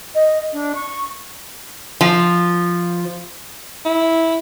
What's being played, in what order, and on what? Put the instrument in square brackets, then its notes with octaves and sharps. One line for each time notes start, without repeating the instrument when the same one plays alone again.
[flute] D#5
D4
C#6
[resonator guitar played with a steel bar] F3
[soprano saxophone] E4